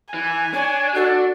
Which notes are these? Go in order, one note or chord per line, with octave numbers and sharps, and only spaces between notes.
E3 G#5
D4 C#5
F#4 A4